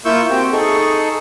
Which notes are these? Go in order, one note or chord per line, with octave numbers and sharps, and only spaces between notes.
A#3 E4 F4 C#6 E6 G6
C4 F#4 G4 G5
D#4 G#4 A4 C#6